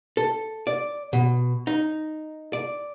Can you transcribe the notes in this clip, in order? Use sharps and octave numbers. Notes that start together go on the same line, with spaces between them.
A4
D5
B2
D#4
D5